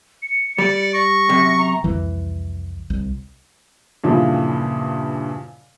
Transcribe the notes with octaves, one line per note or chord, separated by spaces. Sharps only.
C#7
G3 D5
C#6 A#6
F#2 C3
A#5
C2 F2 E3
C2
G2 A#2 C#3 E3 F3